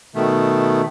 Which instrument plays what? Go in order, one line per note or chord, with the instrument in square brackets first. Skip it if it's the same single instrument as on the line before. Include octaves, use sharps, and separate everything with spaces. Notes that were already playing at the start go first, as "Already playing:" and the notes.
[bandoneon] B2 D#3 A3